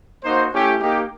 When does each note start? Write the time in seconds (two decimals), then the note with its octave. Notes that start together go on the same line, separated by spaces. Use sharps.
0.23 A#3 D#4 F#4 C5
0.53 A3 C#4 E4 G4
0.80 A#3 D#4 G4